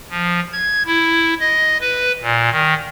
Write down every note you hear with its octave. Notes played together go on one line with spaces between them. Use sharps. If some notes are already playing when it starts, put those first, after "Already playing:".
F3
G#6
E4
D#5
B4
A#2
D#3